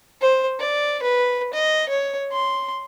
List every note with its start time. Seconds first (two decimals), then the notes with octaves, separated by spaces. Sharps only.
0.21 C5
0.60 D5
1.02 B4
1.54 D#5
1.89 C#5
2.32 C6